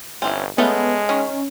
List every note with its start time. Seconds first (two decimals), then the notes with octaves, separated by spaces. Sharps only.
0.22 G1 E3 C4 C#4
0.58 G#3 A3 B3 C#4 A4
1.09 D#3 C#4